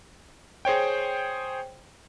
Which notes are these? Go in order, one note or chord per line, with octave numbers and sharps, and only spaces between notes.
G#4 C5 C#5 G5